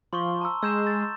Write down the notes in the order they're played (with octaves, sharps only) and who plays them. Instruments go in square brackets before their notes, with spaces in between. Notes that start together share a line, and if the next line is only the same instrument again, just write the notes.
[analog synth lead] F3 [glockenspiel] C6 C#6 G7
[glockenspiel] A5 A#5 E6
[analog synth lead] G#3 [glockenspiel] E6 G6 E7
[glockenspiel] A6